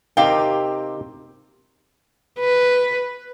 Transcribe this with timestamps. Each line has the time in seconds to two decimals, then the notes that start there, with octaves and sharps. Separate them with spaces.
0.17 C3 D#4 G4 A#4 F5 G5
2.39 B4